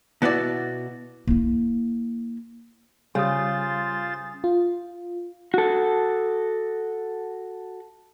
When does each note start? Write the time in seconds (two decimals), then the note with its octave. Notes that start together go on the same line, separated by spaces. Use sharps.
0.22 B2 B3 E4 F#4 D5
1.27 A#3 E4
3.15 C#3 G3 F4 C5 G#5 D#6 A6
4.44 F4
5.54 F#4 A4